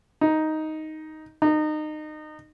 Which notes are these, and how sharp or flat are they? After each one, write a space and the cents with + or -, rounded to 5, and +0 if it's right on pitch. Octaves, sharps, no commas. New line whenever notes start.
D#4 +5
D#4 -25